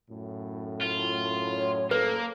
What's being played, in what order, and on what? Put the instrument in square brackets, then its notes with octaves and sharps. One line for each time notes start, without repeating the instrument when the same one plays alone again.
[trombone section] F#2 A2
[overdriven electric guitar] F4
[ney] C#5
[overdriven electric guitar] A#3 [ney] A4 [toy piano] B4